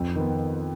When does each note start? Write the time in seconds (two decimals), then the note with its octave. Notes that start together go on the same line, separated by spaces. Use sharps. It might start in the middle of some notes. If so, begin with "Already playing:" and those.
Already playing: F2
0.16 D#3 B3